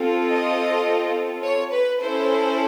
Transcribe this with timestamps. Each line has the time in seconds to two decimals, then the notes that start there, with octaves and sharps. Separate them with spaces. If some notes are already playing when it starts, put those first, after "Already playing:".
Already playing: C4 F4 A4
0.29 D#5
1.43 C#5
1.71 B4
2.00 C#4 E4 A4 C5